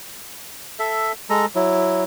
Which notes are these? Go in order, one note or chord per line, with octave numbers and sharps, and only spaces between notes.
A4 E5
G#3 A4 A#5
F#3 E4